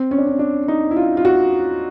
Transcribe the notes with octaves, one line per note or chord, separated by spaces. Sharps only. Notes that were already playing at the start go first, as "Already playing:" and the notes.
Already playing: C4
C#4
D4
C#4
D4
D#4
E4
F4
F4
F#4